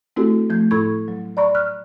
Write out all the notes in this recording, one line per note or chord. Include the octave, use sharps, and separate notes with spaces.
A3 C4 E4 F#4 G4 A4
F3 A3 G6
A2 E4 A4 B5 C#6 G#6
F#3
D5 A#5 B5 C#6
F6 F#6